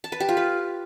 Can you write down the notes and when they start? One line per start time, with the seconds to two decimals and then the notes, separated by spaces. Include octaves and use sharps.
0.04 A5
0.12 B4
0.20 G4
0.29 F4
0.37 B4